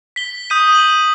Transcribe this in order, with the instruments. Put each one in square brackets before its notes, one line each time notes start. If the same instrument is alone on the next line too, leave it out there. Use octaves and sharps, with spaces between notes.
[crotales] B6 G7
D#6 G6 B6 D#7
D#7 F#7